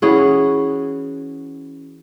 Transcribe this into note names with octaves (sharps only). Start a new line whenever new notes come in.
E3 C#4 F#4 G#4